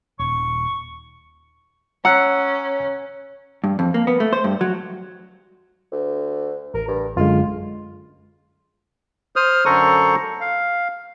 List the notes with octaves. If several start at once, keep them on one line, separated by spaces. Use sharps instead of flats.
D#1 C#6
C#4 F#5 A#5 E6 F#6
G2
F2
A#3
B3
A3
C5
G2
F#3
D2
A1 A#4
G2
F#2 D3 G#3 F4
C5 D#6 F6
F#2 D3 A4 C5 A#5 C#6
F5